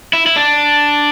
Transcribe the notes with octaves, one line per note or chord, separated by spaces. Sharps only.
E4
E4
D4